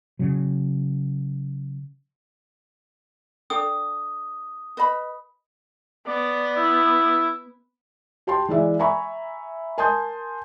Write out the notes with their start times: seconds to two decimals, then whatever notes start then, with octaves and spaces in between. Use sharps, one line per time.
0.19 C#3 F#3
3.50 D4 A4 G5 D#6
4.77 B4 D#5 B5
6.07 B3 D5
6.56 E4
8.27 G4 G5 A5 C6
8.48 E3 G#3 D5 E5
8.79 E5 G#5 A#5 B5 C#6
9.78 A#4 G#5 A5 C6 D#6 G6